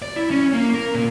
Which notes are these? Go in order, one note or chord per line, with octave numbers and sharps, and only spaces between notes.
D5
E4
C#4
A#3
A#4
A#2